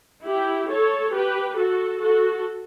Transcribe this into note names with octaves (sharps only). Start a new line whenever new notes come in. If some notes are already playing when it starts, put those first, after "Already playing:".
E4 G4
A4 C#5
G4 B4
F#4 A4
F#4 A4